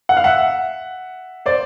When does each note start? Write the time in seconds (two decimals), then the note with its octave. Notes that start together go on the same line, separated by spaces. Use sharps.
0.09 F#5
0.17 F5
0.24 E5 F#5
1.46 C5 D5